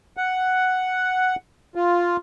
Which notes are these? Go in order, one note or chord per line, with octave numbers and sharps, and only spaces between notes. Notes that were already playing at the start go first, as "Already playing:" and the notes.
F#5
F4